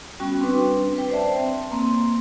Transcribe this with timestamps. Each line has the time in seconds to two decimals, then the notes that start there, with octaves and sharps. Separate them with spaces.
0.20 G3 B3 C#4 F#4 G5
0.39 G3 C4 D4 B4
0.97 B4 G5
1.10 C5 D5 E5 A5
1.36 C4
1.71 A#3 C4